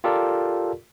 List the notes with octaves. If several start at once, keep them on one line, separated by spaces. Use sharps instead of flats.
F4 G4 A4 A#4 D5